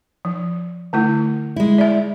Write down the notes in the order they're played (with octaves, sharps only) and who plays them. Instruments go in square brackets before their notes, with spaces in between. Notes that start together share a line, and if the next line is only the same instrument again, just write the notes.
[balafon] F3
D3 A3 E4
[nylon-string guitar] G#3 E4
[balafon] D5 E5